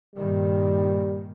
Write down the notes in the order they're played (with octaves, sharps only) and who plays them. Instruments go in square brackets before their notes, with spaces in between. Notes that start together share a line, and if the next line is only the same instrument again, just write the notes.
[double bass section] G2 A#2 D#3 [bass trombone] G3